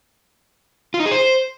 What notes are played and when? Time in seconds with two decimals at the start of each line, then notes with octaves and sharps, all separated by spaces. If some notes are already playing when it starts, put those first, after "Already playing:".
0.94 F4
1.00 D#4
1.06 G#4
1.11 C5